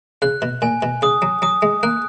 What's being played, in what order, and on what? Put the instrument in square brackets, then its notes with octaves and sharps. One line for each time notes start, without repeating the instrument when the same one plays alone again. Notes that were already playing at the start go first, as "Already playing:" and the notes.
[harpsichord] C#3 [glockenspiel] F#6
[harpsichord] B2
[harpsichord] A#2 [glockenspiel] G#5
[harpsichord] B2
[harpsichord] C#3 [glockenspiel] D#6
[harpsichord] F#3
[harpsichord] F#3 [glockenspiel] D#6
[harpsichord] G#3
[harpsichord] A#3 [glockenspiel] F#6